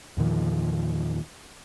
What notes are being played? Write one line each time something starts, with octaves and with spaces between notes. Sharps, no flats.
E2 A#2 D#3 F3